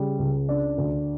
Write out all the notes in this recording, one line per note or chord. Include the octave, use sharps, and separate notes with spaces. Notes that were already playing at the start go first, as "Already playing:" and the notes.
Already playing: C#3 G3
C#2
D4
D2